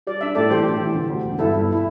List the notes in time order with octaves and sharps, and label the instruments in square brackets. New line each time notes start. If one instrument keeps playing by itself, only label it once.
[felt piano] G3 [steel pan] D5
[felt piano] D4 [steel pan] E5
[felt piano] A2 [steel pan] A4 D5
[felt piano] E3 [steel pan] G4 C5
[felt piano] A2
E3
D3
D2
E1
[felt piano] G2 [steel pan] E4 A4
[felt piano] G1
[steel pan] E4